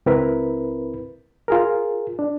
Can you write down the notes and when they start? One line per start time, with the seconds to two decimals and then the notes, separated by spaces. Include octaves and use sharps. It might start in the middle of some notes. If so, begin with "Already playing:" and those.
0.06 C#2 C4 E4 A#4 B4 B5
1.48 F4 G#4 A#4
2.19 D4